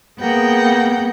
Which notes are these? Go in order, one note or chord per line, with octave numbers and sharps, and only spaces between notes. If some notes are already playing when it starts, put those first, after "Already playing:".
A#3 B3 G#4 F#5 G5